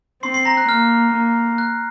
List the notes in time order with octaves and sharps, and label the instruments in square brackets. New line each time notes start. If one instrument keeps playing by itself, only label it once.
[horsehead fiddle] C4 [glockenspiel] C6 C7
[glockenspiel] C6 C7
A#5 A#6
F#6
[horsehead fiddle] A#3 [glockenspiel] F6
[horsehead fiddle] A#3
[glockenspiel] F#6